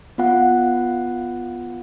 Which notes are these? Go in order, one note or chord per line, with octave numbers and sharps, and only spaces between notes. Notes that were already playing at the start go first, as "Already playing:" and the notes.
B3 F4 F#5